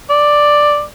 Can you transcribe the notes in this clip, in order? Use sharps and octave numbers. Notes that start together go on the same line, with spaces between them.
D5